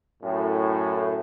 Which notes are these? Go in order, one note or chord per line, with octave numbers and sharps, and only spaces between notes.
F#2 A2